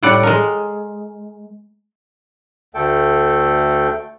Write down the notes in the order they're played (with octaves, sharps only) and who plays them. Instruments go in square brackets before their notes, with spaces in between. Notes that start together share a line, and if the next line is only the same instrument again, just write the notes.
[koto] A2 G3 D5 F#5
G#3 A#4
[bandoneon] D2 A3 A4 G5